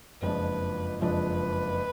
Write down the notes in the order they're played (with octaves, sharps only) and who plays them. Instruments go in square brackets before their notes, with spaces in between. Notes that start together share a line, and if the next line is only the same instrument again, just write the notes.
[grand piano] F#1 F2 F3 G#3 D4 [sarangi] B4
[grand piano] F#1 F2 F3 G#3 D4 [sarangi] B4